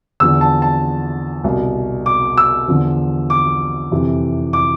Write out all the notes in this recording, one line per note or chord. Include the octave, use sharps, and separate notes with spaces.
E2 D3 F3 E6
A5
A5
C2 B2
D6
E6
E2 D3 F3
D6
F2 C3 E3
D6